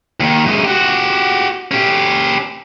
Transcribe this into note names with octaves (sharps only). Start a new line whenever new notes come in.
D#2 D#3
F#2 G#3
F#4 G4
C#4 G4